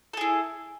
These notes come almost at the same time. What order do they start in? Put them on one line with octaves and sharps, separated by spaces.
A4 G#4 E4